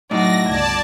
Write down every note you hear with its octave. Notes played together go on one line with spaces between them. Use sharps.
A2 F#3 D#4 F#4 D5 A#6
G1 C#2 D5 A5 G#6